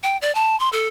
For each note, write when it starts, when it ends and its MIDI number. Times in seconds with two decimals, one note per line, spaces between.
0.03 0.17 79
0.22 0.34 74
0.35 0.58 81
0.60 0.69 84
0.73 0.88 69